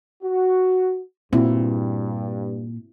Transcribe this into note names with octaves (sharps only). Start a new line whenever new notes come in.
F#4
G2 A#2 C4 E4 F#4